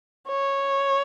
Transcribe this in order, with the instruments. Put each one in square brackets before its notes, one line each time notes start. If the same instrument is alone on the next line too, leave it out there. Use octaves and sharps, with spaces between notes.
[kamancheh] C#5